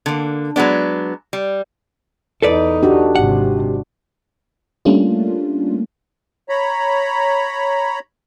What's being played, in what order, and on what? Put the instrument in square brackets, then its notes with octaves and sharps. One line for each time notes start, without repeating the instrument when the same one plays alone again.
[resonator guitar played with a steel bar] D3 A#3
F#3 G#3 B3 D4
G3
[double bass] E2 D#4 [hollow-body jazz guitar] A4 B4 D5
[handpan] D4 F#4 [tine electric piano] G4
[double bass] G#1 C3 [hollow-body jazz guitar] F#5
[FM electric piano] G3 A3 A#3 C#4 D4 F4
[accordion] C#5 A#5 B5